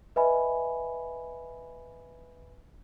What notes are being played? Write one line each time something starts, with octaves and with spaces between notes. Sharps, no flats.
B4 D#5 E5 G#5 B5